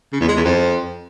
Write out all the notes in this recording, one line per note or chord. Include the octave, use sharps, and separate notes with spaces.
C#3
E2
G#3
E2
F2